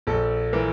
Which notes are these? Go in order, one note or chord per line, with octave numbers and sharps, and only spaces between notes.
A#1 A4
E3 A#4